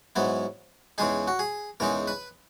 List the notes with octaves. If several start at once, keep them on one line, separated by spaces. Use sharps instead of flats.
G#2 F#3 B3 E4
E2 C#3 G#3 D#4 G#4
F#4
G#4
E2 C#3 G#3 D#4 A#4
B4